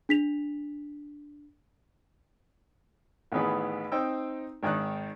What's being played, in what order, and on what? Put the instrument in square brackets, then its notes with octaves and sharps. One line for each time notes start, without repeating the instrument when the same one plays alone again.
[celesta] D4 B6 F7
[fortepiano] A1 D#3 E3 B3 G#4 B4
C4 D#4 G5 E6
G#1 D#3 D#4 F#6